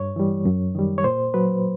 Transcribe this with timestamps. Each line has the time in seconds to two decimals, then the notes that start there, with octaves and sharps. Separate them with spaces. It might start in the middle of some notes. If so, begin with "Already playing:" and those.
Already playing: G2 C#5
0.16 E3 G3
0.45 F#2
0.75 D#3 G3
0.98 C#5
1.04 A#2 C5
1.34 F#3 B4